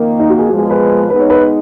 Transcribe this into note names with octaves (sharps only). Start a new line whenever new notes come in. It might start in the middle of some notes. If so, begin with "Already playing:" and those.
Already playing: F2 D#3 A#3
D#4
F#4
G#4
A#2 F3 G#3 B3 F#4
G#4
B4
G#3 B3 D#4 B4
C#5
B4